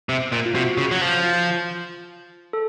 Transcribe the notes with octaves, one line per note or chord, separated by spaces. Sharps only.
C3
A#2
F4
C3 F#4
C#3
F#3
F3
F4
A4